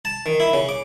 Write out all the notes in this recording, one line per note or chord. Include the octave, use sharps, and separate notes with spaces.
A5
D#3
E4
C#3
D6